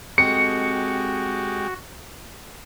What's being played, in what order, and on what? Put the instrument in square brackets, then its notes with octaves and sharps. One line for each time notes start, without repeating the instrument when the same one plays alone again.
[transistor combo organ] G#3 G4 [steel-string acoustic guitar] C4 A4 D#5 [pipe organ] F#4 [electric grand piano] C#7